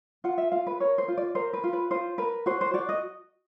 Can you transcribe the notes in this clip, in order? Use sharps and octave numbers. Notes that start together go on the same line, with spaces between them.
F4 F#5
E5
F4 F5
B4
A#4 C#5
C5
F4
D5
A#4 C5
B4
F4
B4
F4 C5
A#4 B4
F#4 C5
C5
F#4 D5
D#5